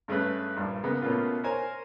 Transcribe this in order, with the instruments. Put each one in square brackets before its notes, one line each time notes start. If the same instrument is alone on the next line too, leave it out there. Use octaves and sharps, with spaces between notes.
[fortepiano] G2 G#3 A3 C#4 G#4 B4
A#1 G2 D5
C#3 G#3 A#3 B3
B2 A3 A#3 C#4 F4 B4
A#4 C5 C#5 G#5 A#5